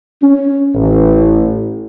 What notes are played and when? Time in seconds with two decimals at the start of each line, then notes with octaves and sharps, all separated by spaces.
0.23 C#4
0.75 A1